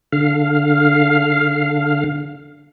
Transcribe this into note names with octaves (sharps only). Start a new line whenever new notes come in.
D3 F5